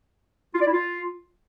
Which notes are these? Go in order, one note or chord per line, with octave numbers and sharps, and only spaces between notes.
F4
D5
E4
F4